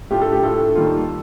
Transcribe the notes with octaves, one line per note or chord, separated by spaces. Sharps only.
A2 A3 D4 F4 G4
A4
G4
A2 A3 D4 F4 A4
D#2 D#3 G3 A#3 F4